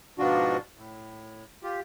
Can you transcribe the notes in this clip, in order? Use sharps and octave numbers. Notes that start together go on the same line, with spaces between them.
G#2 B2 F3 D4 F4 F#4
A2
F4 G4